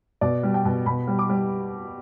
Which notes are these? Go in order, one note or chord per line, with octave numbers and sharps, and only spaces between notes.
B2 D5
G3
G5
B2
B2 B5
G3
D6
G3